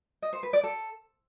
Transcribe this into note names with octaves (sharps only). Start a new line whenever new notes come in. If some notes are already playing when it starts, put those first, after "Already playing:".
D#5
C5
B4
D5
A4